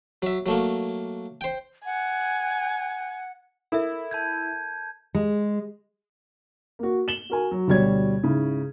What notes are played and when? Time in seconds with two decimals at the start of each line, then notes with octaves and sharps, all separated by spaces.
0.22 F#3 E5
0.46 F#3 A3 A#3
1.41 C5 G5
1.85 F#5 G#5
3.72 E4 A4 A#4 E5
4.11 A5 G6 G#6
5.15 G#3
6.79 A#3 F#4
7.08 E7 F#7 G7
7.30 F#4 A#4 G#5
7.51 F#3
7.68 D2 B2 G3 C#5 G#6
8.23 G#2 C#3 E4